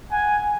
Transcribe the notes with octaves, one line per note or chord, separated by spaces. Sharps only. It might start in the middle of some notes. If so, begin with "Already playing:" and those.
F#5 G#5